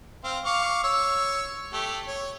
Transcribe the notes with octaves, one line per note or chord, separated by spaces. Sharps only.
C4 C5 F5
F5 C#6 D6
C#5 C#6 E6
A3 G4
C#5